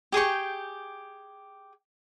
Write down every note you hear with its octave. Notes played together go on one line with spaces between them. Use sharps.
G4 G#4 G5 C#6